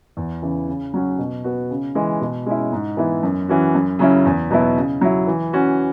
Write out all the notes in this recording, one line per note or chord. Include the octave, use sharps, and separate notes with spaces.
E2
C#3 E3
C#3
F#3 C#4 F#4
B2
B3 F#4
C#3
E3 G#3
B2
G#3 C#4 E4
G#2
E3 B3 E4
F#2
E3 C#4 F#4
F#2
C#3 F#3 C#4 E4
E2
B2 F#3 B3 E4
C#3
F#3 E4
E3
C#4 F#4